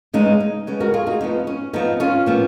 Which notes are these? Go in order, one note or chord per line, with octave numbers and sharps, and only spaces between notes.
C#3 G#3 B3 D#4
D#4
C#3 G#3 B3
F#4 A#4
F4 G#4
D#4 F#4
F2 F3 B3 D#4
C#4
F2 F3 B3 D#4
C#4 F4
A#2 F3 B3